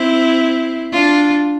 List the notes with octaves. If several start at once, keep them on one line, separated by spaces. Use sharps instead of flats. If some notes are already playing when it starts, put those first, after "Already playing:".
Already playing: C4 E4
D4 F4